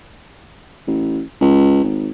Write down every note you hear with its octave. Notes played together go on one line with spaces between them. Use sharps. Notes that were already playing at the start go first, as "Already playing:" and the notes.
A1
C#2
G#1